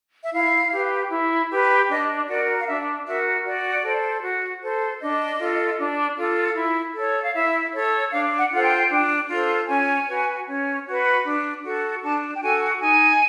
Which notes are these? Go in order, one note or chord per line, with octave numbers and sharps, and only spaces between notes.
E5
E4 F5
G4 B4
E4
G4 B4
D4 D#5
F#4 A#4 D5
F5
D4 E5
F#4 A#4 E5
F#4 D5
A4 C5
F#4
A4 C5
D4 D#5
F4 A4
D4
F4 A4
E4
A4 C#5
F5
E4 E5
A4 C#5
D4 F5
F#5
F4 A4 C5 F#5
G5
D4
F4 A4 C5
C#4 G#5
F#4 B4
C#4
F#4 B4
D4
F#4 A4
D4 A5
G5
F#4 A4 G#5
D#4 G#5